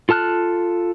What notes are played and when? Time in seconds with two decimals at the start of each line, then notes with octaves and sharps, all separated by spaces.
0.09 F4 A4 A5 F6 F#6